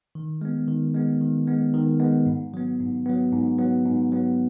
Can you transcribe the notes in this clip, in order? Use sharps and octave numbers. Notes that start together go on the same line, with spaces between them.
D#3
G#3 B3
D#3
G#3 B3
D#3
G#3 B3
D#3
G#3 B3
G#2
F#3 B3
G#2
F#3 B3
G#2
F#3 B3
G#2
F#3 B3